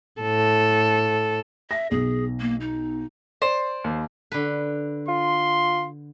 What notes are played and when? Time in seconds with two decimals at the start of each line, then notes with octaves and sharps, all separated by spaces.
0.21 A2 A4
1.71 E5 A#6
1.91 B1 G#4
2.40 A#3
2.61 D#4
3.42 C5 D5
3.84 D#2
4.32 D3 B4
5.08 F4 C6